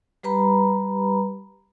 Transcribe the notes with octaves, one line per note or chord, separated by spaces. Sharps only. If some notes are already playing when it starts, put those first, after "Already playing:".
G3 G4 B4 A#5 B5